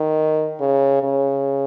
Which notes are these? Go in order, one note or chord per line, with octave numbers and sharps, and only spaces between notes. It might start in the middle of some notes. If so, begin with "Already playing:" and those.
Already playing: D#3
C#3
C#3